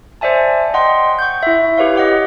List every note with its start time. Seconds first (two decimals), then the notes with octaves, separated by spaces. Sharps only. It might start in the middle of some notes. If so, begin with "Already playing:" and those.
0.21 C5 D5 E5 G#5 A5
0.74 D#5 F#5 G5 C6
1.19 C#6 G6
1.43 E4 E5
1.78 G4 B4 C#5 F5
1.95 D#5 F#5 D6